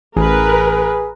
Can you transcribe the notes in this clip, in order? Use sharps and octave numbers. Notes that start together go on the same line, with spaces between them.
A1 G#4 A#4 B4